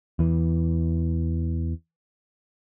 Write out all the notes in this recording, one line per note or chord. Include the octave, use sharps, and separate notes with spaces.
E2 E3